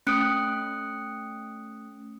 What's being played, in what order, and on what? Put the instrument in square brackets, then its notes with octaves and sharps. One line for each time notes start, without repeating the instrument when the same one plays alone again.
[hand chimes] A3 C#4 D#6 F#6 C#7 D7